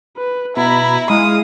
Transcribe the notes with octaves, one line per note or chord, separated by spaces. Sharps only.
B4
B2 E4 A#5 B5
G#3 E4 F5 D#6